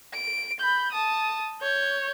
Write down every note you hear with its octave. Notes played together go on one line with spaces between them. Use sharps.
D7
B5 G6
A5 D#6
C#5 G6